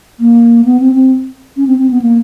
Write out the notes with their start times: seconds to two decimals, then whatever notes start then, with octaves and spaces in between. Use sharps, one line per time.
0.20 A#3
0.65 B3
0.80 C4
0.95 C4
1.57 C#4
1.67 C4
1.79 C4
1.91 B3
2.02 A#3